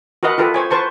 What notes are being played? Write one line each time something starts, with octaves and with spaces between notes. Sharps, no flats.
F#4 A#4 B4 D#5 F#5
F4 G4 A4 B4
C5 C#5 G#5
B4 C5 A5 C#6